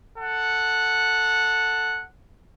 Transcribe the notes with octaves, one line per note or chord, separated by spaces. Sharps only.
A4 F#5